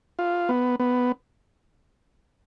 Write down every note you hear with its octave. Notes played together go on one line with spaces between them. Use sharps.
F4
B3
B3